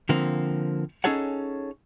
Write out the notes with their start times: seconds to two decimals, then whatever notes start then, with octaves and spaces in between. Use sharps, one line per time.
0.09 D3 F3 A#3 C4
1.04 C#4 D#4 G#4 A4 C#5 F#5